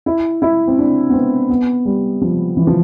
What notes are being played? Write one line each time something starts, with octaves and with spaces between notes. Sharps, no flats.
E4
E4
C4
D4
B3
C4
B3
G3
F3
E3
F3